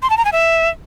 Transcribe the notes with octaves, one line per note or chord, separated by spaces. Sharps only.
C6
A5
A#5
G#5
E5